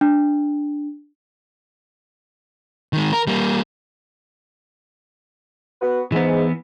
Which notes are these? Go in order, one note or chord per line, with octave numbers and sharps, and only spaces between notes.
D4
D#3 G#3
A#4
G3 A#3
B3 F#4 B4
G#2 E3 B3